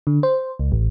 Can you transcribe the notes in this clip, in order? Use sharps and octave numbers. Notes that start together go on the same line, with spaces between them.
D3
C5
C#2
A1